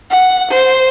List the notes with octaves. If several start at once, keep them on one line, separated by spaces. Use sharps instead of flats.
F#5
C5